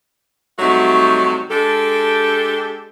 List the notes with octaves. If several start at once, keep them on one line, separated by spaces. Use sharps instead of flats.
C3 F#3 G3 A3 D#4 F#4
G#3 D4 G4 A4